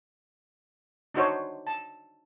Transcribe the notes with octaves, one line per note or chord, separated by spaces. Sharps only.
D4 D#4 F#4 C5 C#5
A5